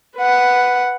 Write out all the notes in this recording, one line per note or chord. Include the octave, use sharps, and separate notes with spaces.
B4 F#5